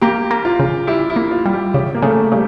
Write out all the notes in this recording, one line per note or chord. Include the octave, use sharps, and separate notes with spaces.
A#3 G4
A#3
F4
C#3
G3 E4
E4
A#3
F4
G3
G4
C#3 G4
A#3
C#3 A3
C#3 G3